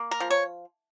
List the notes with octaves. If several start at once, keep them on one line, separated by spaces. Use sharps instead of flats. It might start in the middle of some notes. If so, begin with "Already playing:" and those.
Already playing: A#3
A#4
F3
C#5